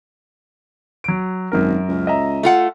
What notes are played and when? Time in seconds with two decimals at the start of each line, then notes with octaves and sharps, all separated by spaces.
1.04 F#3 D7
1.52 G#1 F#2 A#4
1.88 C#2
2.07 D#5 E5 A#5
2.43 A3 F4 F#5